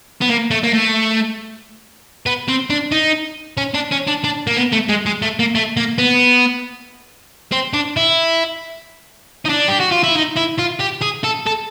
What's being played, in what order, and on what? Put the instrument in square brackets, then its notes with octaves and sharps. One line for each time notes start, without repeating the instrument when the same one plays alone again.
[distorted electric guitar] B3
A#3
A3
A#3
A3
B3
C4
D4
D#4
C#4
D4
C#4
D4
D4
A#3
B3
A3
G#3
G#3
A3
A#3
A3
A#3
B3
C4
D4
E4
D#4
D4
G4
F#4
F4
E4
D#4
E4
F4
G4
G#4
A4
A4